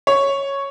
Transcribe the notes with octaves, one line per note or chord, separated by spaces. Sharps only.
C#5